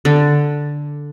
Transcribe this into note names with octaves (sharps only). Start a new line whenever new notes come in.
D3